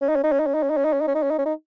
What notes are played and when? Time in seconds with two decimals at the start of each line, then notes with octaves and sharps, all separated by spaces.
0.02 C#4
0.09 D#4
0.16 C#4
0.24 D#4
0.32 C#4
0.40 D#4
0.46 C#4
0.54 D#4
0.63 C#4
0.70 D#4
0.77 C#4
0.85 D#4
0.93 C#4
1.01 D#4
1.07 C#4
1.15 D#4
1.23 C#4
1.31 D#4
1.38 C#4
1.46 D#4